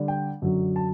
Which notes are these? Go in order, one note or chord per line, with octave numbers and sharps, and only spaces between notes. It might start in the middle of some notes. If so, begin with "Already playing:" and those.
Already playing: D3 G3 D4
G5
F#2 D3 F#3
A5